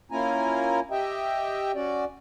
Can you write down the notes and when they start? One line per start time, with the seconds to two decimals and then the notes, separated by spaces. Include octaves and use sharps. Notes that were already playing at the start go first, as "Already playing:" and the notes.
0.11 A#3 C#4 E4 F4 G#5 A#5
0.91 G4 D#5 E5 G5
1.75 C#4 F#4 D5